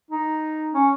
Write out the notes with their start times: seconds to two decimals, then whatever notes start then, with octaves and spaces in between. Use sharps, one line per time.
0.11 D#4
0.74 C#4